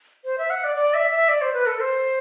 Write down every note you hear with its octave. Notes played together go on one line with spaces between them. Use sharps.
C5
E5
F#5
D5
D5
E5
E5
D5
C5
B4
A4
C5